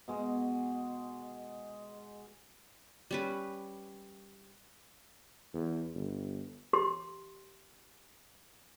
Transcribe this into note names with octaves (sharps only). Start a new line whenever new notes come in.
B2 G#3
G3 C#4 B4
E2
G1
G4 C6